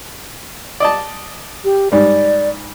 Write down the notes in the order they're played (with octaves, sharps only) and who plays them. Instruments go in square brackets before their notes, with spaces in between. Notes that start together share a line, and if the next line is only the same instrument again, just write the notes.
[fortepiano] D5 D#5 A5
[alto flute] G4
[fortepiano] G#2 G3 [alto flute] D5